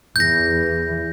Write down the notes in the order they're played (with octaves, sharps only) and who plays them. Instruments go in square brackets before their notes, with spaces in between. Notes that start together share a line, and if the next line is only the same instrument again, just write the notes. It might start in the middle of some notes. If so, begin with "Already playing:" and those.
[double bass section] E2 E3 [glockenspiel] G6 A#6